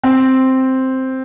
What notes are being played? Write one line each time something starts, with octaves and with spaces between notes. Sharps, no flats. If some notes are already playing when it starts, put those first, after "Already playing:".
C4